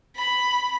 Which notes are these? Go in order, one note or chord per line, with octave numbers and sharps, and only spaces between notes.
B5